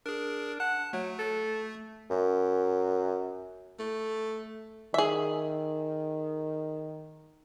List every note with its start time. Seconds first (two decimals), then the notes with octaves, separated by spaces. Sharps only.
0.06 D4 G#4 A#4
0.60 F#5 A5
0.93 F#3 A3
1.19 A4
2.10 F#2
3.80 A3
4.94 D#3 G#4 E5